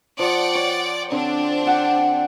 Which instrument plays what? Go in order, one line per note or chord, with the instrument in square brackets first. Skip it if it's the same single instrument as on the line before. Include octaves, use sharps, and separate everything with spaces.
[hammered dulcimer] F3 [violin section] D5 F#5 G5
[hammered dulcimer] C#5
[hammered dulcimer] D3 [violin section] C4 D4
[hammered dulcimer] G4 F#5